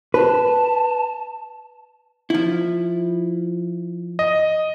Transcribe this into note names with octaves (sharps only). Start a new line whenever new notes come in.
B4 A5
F3 E4
D#5